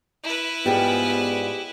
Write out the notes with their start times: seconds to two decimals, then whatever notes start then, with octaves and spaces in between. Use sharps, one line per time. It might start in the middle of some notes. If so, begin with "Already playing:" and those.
0.24 E4 B4
0.66 G#2 F3 G3 B3 G4 G#4